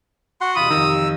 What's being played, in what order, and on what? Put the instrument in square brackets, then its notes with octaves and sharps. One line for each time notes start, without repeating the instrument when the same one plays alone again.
[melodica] F#4 F#5 C6
[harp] E1 C2 F#6 [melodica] F4 B5 [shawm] D#6
[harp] F2 C#5 F5 [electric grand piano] D#3 [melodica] A#5 E6